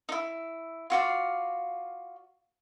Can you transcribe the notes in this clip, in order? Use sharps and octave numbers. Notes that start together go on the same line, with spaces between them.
D#4 E4
F4 F#4 D5 F5